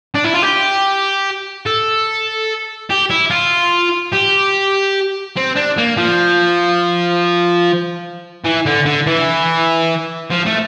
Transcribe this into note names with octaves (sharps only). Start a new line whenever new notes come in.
D4
E4
F4
G4
A4
G4
E4
F4
G4
C4
D4
A#3
F3
E3
D3
D3
E3
F3
A3